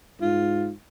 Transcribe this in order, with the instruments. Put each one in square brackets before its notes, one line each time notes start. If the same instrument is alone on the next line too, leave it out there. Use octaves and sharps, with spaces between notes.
[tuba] G#2 [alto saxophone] F4